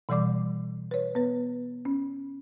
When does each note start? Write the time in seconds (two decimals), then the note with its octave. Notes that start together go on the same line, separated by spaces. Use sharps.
0.09 B2 E3 G3 D5 D6
0.91 B4 C#5
1.15 B3 B4
1.85 C#4